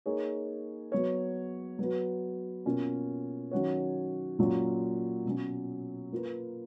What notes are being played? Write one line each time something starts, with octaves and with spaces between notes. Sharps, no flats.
A#3 D#4 G#4 C#5
F#3 B3 F#4 C#5
F#3 B3 F#4 B4
B2 A#3 C#4 F4
D#3 F#3 C#4 F#4 C#5
A#2 F#3 C#4 F4
B2 F#3 C#4
A#3 F4 B4